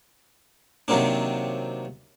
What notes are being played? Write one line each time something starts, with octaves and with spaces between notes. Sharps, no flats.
C3 D#3 F#3 A#3 C4 D4